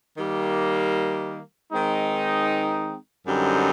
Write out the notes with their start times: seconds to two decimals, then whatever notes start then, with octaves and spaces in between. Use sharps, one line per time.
0.16 D#3 G3 A#3
1.72 D#3 G#3 C4 D#4
3.26 F#2 D3 G3 C4 D#4